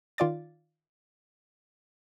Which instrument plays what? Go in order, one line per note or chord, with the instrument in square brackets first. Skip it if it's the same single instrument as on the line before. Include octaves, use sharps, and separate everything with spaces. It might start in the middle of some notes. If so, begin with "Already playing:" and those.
[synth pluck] D#3 F4 D5 D6 A6